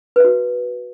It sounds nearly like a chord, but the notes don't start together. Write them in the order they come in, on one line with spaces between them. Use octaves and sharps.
B4 E5 F#4